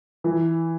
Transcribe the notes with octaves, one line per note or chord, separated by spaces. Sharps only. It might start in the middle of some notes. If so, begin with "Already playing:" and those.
E3